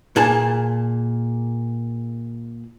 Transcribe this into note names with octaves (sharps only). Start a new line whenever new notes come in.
A#2 G#4 A5